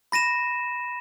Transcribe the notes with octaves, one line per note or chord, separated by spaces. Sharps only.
B5 A#6 D#7 E7